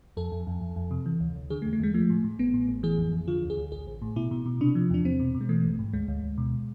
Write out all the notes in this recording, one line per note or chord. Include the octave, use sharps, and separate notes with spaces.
F2 A4
F2
F2
F2
F2
C3
E3
D2
D2
D3 G#4
A3
E2
A3
E2 G#3
F3 A3
A2
A2
A1 B3
A2
A1
E3 G#4
F2
F2
D3 F4
D2
G#4
D2
A1 G#4
A1
A2
B2 E4
B2
B2
C3 D4
F3
E2 D4
E2 C4
B2
B2
G#3
E3 A3
G#1
G#2
D2 G#3
D2
D2
B2